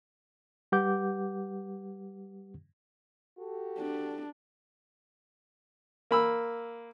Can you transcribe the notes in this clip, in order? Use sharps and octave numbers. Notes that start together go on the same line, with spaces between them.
G3 G4 B4 F#5 D6 G6
F#4 G4 A4
D4
A#3 B5 E6